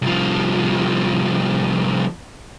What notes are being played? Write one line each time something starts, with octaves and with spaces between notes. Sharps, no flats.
C2 F3